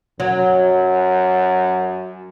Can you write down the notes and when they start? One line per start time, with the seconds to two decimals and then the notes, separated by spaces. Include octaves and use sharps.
0.20 F#2 F#3